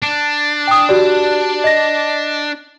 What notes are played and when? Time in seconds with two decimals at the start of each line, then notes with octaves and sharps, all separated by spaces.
0.02 D4
0.67 G5 D#6
0.89 F#4 G4 D5
1.64 D#5 A#6